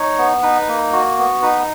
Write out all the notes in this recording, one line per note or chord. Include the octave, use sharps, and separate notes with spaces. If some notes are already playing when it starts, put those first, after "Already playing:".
Already playing: D#4 C#5
B3
D#4 B4
A#3
F#4
B3
D#4 B4